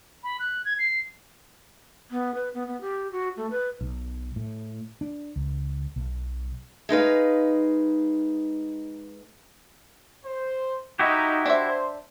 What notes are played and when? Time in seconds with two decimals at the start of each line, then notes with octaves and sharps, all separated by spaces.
0.24 B5
0.40 F#6
0.65 G#6
0.79 C7
2.11 B3
2.35 B4
2.54 B3
2.67 B3
2.81 G4
3.12 F#4
3.37 A3
3.51 B4
3.81 B1
4.36 A2
5.01 D4
5.36 C#2
5.96 B1
6.89 G#3 D#4 B4 F5
10.25 C5
10.99 D#4 E4 F#4 G4
11.46 D4 C5 E5